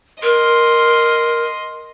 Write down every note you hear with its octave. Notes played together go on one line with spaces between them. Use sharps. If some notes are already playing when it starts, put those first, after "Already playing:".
A#4 D#5 C6